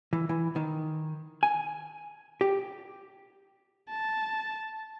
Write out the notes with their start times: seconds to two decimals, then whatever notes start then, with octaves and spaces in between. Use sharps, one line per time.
0.13 E3
0.29 E3
0.56 D#3
1.43 G#5
2.41 G4
3.90 A5